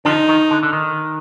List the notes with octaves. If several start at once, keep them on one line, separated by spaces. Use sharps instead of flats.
D3 F3 D#4
D#3
D3
D3
D#3